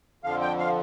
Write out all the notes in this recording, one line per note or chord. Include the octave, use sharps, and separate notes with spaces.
F2 D3 F3 F5
G5
F5